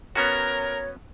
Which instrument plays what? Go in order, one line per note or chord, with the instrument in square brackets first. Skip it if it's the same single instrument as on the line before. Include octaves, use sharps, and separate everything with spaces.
[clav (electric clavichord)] B3 C#4 F#4 [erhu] A#4 [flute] C#5